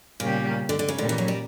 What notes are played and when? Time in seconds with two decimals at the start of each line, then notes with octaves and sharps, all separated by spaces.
0.20 A#2 C#3 G3 A#3 C#4 G4
0.69 D3
0.79 D3
0.89 C#3
0.98 A#2 D3 G3 C#4
1.09 E3
1.18 F#3
1.28 G3